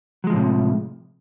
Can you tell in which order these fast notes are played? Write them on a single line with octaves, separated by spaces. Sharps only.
F#3 G#3 F3 A2 C3